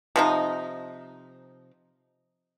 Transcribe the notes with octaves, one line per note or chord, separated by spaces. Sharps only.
C3 F3 D#4